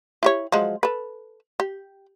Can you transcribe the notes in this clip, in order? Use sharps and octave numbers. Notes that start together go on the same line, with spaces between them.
E4 G4 C#5
F3 F#3 G#3
A4 B4
G4